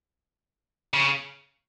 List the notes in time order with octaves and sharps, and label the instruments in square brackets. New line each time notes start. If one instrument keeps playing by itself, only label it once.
[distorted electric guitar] C#3